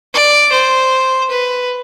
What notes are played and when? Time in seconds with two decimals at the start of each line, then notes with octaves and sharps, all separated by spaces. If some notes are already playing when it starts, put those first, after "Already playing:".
0.14 D5
0.53 C5
1.30 B4